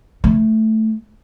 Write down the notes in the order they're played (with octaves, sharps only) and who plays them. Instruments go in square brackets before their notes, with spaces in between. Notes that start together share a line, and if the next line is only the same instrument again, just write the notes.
[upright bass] A3